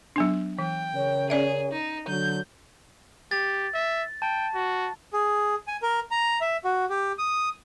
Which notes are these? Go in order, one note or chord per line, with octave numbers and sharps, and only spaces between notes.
F#3 B3 D4
E3 G5
C#3 A#4 C#5
C#4 G#4 D5 E5
D#4
D3 F#3 G6
G4 A6
E5
G5 A5
F#4
G#4
G#5
A#4
A#5
E5
F#4
G4
D#6